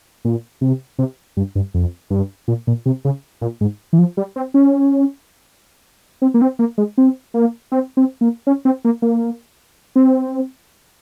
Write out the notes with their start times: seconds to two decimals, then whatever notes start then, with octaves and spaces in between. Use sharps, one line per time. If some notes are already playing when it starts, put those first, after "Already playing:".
0.25 A#2
0.61 C3
0.99 C3
1.37 G2
1.55 G2
1.74 F2
2.10 G2
2.48 A#2
2.67 A#2
2.86 C3
3.05 C#3
3.41 A#2
3.61 G#2
3.93 E3
3.99 F3
4.17 G3
4.36 C4
4.54 C#4
6.22 C4
6.34 A#3
6.42 C4
6.59 A#3
6.78 G#3
6.98 C4
7.34 A#3
7.72 C4
7.97 C4
8.21 A#3
8.47 C#4
8.65 C4
8.85 A#3
9.02 A#3
9.96 C4